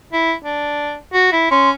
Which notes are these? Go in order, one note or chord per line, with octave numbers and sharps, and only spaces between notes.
E4
D4
F#4
E4
C#4 C6